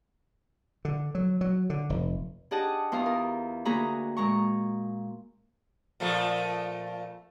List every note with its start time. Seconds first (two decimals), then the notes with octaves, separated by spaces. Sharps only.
0.85 D3
1.15 F#3
1.41 F#3
1.70 D3
1.90 F1
2.51 D4 G4 G#4 D#5 F#5 A5
2.92 E2 F4 F5 D#6
3.06 A#4
3.65 D2 A#3 F#4 G#4 A#5 B5
4.17 A#2 G#3 A#5 C#6
6.00 A#2 F3 A3